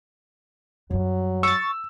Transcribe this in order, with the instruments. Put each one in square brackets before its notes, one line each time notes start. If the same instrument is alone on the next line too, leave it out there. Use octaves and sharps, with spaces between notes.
[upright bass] F#2 G3 [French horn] F#3
[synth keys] C#6 A6 [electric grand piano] E6